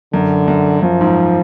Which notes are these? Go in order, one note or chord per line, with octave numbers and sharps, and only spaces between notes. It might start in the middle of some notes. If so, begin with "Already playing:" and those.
F#2 D3
F#2
F#2 F3
G#2